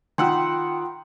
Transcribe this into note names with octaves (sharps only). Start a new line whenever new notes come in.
D#3 F4 F#5 G5 C6 E6